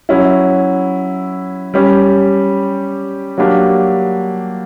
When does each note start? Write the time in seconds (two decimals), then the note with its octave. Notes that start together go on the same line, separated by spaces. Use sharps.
0.09 F#3 C#4 E4
1.74 G3 C#4 G4
3.38 F#3 A#3 D4 G4